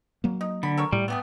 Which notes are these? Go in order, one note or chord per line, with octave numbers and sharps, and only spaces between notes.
F#3 A#3
D#4
D3 B5
A4 A#4 C#5
A2 G3
A3 B3 G4 G#4